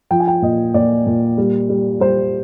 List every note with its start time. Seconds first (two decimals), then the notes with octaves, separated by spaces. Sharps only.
0.11 F3 G5
0.20 G#5
0.28 G5
0.42 A#2 D#5
0.74 A#2 D5
1.07 A#2
1.37 G3
1.69 G3
2.00 G3 C5